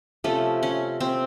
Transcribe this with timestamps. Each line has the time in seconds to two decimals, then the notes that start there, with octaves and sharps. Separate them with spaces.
0.24 C3 F3 A3 C#4
0.63 C#4
1.00 C4